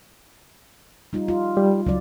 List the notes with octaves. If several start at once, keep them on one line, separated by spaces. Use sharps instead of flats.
G3 D#4 F4
F4
G3
C#2 F#3 D5